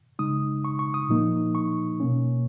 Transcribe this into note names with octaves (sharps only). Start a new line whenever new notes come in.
C#3 G#3 D#4 D#6
C#6
C#6
D#6
A#2 F3 A#3 D#4
C#6
B2 A#3 C#4